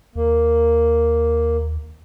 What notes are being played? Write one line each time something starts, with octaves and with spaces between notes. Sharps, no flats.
D#2 A#3